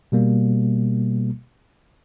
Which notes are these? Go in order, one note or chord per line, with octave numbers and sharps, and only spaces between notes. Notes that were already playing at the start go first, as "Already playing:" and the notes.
B2 G3 A#3